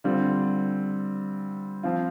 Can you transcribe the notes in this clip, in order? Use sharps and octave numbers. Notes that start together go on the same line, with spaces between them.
D3 G3 C4 F4
F3 C4 F4